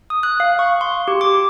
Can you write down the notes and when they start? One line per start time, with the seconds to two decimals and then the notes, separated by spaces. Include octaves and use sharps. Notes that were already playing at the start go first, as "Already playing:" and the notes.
0.10 D#6
0.23 F#6
0.40 F5
0.59 C#6
0.81 C6
1.08 G4
1.21 D6